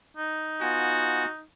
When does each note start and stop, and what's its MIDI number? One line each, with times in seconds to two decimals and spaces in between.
0.17 1.43 63
0.61 1.25 59
0.61 1.25 65
0.61 1.28 66
0.61 1.25 80